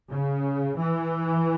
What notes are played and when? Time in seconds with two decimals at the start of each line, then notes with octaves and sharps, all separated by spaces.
0.10 C#3
0.77 E3